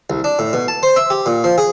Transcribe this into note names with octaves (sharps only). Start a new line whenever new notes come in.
C2
D4
A2
B2
A5
C5
E5
G4
A#2
F3
G#4